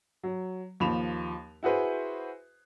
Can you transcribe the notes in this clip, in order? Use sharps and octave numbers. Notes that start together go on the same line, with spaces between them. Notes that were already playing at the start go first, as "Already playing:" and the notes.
F#3
D#2 F3 B5 E7 F7
E4 F#4 G#4 B4 C5